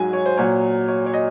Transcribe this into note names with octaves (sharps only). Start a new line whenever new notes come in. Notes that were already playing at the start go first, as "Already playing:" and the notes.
Already playing: G#2 F#3 G#5
C#5
C5
A#2 F#3 C#5
C#5
C#5
D#5